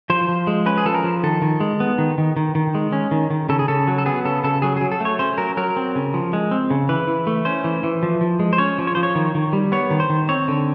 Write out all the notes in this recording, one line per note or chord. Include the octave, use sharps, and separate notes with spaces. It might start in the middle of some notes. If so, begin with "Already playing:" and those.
F3 C5
F3
G#3
C#4 B4
G#4
F3 A4
A#4
F3
D#3 A4
D#3
G#3
B3
D#3
D#3
D#3
D#3
G#3
C#4
D#3
D#3
C#3 A4
G#4
C#3 A4
F#3
A4
B3 G#4
C#3 A4
C#3 A4
F#3 G#4
F#3 G#4
A4
A3 C#5
C#4 C5
F#3 A#4
F#3 A#4
C4
C#3
F3
G#3
C4
C#3
E3 B4
E3
A3
C#4 C5
E3
E3
F3
F3
G#3
C5
C#4 C#5
F3
C#5
F3 C5
C#5
D#3
D#3
G3
B3 C#5
D#3
C5
D#3
C4 C#5
D3